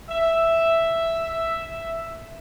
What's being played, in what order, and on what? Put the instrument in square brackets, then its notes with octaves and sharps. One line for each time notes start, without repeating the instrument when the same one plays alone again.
[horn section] E5